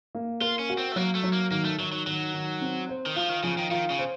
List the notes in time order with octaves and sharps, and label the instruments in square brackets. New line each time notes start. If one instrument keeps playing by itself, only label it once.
[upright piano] A#3
[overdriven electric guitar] F4 [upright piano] A#4
[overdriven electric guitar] C#4
[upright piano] F#4
[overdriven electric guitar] C4
A3
[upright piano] F#3 [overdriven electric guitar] A#3
[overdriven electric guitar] A3
[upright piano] F#3
[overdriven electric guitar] A#3
[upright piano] D#3 [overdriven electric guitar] A#3
[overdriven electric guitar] A3
[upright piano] D#3 [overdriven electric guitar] F#3
[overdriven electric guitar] F#3
[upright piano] D#3 [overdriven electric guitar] F#3
[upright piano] D#3
C4
C5
[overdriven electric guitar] D#3
[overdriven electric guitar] F3 [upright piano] F4
[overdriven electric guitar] D#3
[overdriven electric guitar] C#3 [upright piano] F3
[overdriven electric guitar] D#3
[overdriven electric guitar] D#3 [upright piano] F4
[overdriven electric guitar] C#3
[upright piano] C5